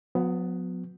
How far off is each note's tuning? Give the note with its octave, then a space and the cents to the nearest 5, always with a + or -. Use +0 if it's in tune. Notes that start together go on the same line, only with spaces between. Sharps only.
F#3 -40 B3 +20